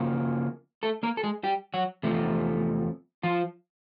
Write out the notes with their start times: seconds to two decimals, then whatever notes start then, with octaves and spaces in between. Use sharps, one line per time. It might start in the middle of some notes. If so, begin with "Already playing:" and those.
Already playing: C#3 F3 A#3
0.83 A3 A4
1.03 A#3 A#4
1.17 A4
1.24 G#3 G#4
1.43 G3 G4
1.74 F#3 F#4
2.03 E2 C3 F3 A3
3.23 F3 F4